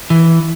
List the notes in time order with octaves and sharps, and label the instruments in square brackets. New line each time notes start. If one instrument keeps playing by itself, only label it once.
[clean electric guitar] E3